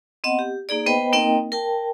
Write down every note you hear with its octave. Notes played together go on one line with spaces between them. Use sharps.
B3 C4 D#5 F#5
G4
A#3 D#4 G#4 D5
B3 B4 C5 D#5 G5 B5
A#3 C4 D#4 A#4 D#5 G5
A#4 G5 A5